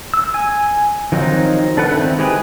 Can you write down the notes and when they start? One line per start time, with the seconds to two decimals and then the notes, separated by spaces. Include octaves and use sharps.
0.14 E6
0.34 G#5
1.12 D#3 F3 F#3 C4 D#4
1.77 D4 A4 B4 F#5
1.92 D#3 C4 E4
2.19 G#3 G4 G#4 B4